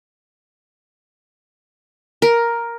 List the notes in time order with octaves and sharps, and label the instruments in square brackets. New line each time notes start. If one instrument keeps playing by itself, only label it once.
[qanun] A#4